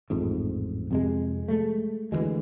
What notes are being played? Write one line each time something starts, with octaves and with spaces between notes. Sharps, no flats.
A1 F2 G#2
F2 C3 G#3
G#3 A3
D2 E3 F#3 G#3